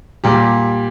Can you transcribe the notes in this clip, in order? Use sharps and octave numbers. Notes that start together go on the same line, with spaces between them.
A#2 G3 G4